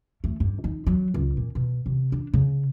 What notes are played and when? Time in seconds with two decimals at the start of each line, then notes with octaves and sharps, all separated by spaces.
0.24 A3
0.40 G2
0.64 D#4
0.87 F#3
1.14 C#2
1.37 A#2
1.55 B2
1.86 C3
2.12 D4
2.34 C#3